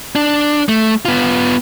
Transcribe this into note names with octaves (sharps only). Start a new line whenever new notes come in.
D4
A3
B3 F4